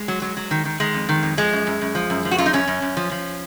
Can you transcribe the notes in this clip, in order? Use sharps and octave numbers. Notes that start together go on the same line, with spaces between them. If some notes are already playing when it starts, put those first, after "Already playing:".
Already playing: G#3
F#3
F#3
F#3
D#3
D#3
D#3 G#3
F2
D#3
F2
F3 G#3
F#2
F#2
F#2
F3
F#2
F3
F#4
F#2 F4
D#4
F#2 C#4
F#2
F#2
F3
F3